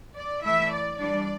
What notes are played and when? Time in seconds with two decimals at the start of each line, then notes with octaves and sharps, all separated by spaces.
0.14 D5
0.42 E3 A3 E4 E5
0.70 D5
0.98 E3 G3 D4 D5